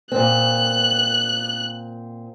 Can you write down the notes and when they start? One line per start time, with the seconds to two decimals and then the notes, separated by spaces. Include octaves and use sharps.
0.12 A#2 C4 F#6